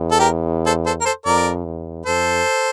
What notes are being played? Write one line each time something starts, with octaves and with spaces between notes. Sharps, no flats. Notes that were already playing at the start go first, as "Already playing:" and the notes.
Already playing: E2
A4
G4 A#4
A4 C5
A4 C5
A#4
A4 C5
F2 A#4 D5
E2
F2 A4 C5